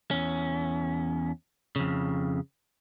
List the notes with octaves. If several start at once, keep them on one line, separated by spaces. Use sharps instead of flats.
E2 C#4
F2 C#3